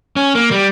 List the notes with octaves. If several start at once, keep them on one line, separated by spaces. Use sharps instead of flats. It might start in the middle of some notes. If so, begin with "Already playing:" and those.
C#4
A#3
G3